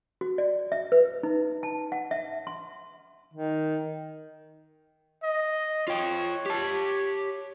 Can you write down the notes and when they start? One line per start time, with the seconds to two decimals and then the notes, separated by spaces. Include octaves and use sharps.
0.21 F#4
0.38 D5
0.72 E5
0.92 B4
1.23 D#4
1.63 A5
1.92 F#5
2.11 E5
2.47 C6
3.34 D#3
5.23 D#5
5.88 F4 C#5 G5
6.46 G4 A5